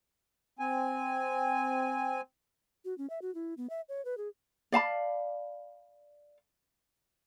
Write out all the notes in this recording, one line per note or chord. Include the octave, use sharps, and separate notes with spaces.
C4 G#5
F#4
C#4
E5
F#4
E4
B3
E5
C#5
B4
G#4
D5 F5 A5 B5